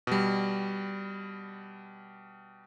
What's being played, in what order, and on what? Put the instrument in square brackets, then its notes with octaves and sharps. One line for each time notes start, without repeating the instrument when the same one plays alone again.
[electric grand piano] B2 G3